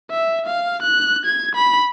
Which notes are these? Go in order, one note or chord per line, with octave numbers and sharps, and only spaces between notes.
E5
F5
F#6
G#6
B5